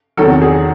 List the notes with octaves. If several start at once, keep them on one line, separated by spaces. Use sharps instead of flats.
E2 C3 D#3 F#3 A4
G#4